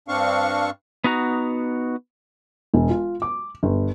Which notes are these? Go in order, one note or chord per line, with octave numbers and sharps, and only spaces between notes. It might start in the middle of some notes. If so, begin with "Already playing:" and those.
G2 C4 D4 F5 C#6
B3 D#4 F#4 A#5
E1
F4
D6
G1